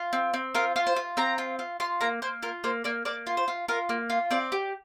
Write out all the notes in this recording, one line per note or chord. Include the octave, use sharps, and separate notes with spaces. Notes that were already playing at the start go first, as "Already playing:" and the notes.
Already playing: F4
C4
C4
F4 A#4
F4
C5
F4
C4 A#5
F4
F4
F4 C6
A#3 A#5
A#3 C5
F4 A#4
A#3 C5
A#3 D5
A#3 D5
F4
C5
F4
F4 A#4
A#3
F4
C4 D5
G4